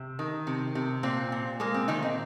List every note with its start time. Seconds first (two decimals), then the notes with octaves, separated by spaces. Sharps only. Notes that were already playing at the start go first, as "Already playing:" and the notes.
Already playing: C3
0.19 D#3
0.47 C3
0.75 C3
1.03 A#2 C4
1.32 A#2
1.60 G#3 A#3
1.74 C4
1.88 A#2 D#3 D#4
2.02 C4